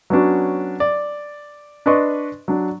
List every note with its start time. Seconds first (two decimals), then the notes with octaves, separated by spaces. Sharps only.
0.10 F#3 B3 C#4 D4 F#4
0.80 D5
1.86 D4 B4 D5 D#5 C6 C#6
2.48 F#3 D4